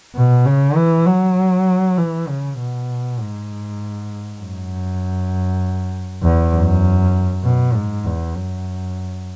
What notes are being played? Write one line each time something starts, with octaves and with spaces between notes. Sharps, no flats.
B2
C#3
E3
F#3
E3
C#3
B2
G#2
F#2
E2
F#2
B2
G#2
E2
F#2